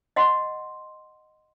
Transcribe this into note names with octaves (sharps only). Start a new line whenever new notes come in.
D#5 F#5 C6